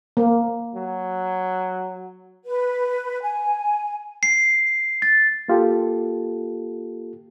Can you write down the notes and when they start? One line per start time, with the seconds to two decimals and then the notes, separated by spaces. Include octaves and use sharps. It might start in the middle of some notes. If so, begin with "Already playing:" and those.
0.17 A#3
0.75 F#3
2.45 B4
3.22 G#5
4.23 C7
5.02 A6
5.48 A#3 F4 G4 A4